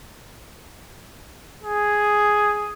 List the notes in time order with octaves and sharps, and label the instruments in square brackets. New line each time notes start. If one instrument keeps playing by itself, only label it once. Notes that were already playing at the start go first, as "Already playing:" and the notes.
[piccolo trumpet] G#4